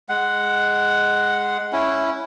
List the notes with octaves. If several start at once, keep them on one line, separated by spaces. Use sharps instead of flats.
G#3 F#5
C#4 E4